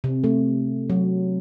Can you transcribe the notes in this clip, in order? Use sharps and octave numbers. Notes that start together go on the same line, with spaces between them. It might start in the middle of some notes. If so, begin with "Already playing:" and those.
C3
A3
F#3